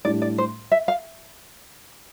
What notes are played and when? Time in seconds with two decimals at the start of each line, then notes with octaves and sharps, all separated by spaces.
0.05 A2 G3 D4 D5
0.22 D5
0.38 C5
0.72 E5
0.88 F5